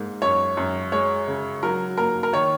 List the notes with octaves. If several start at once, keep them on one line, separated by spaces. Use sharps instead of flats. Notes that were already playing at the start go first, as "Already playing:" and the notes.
Already playing: G#2 A#3
F#2 C#5
F#2
G#3 C#5
C#3
F#3 A#4
A#3 A#4
A#4
D#3 C#5